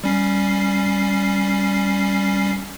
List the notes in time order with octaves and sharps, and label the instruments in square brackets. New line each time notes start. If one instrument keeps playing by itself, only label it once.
[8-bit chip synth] G3 C#4 C7